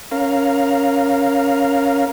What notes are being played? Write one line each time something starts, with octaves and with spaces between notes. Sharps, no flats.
C#4 A#4 F5